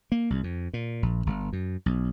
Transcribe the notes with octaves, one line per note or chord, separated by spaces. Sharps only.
A#3
C2
F2
A#2
A#1
G1
F#2
B1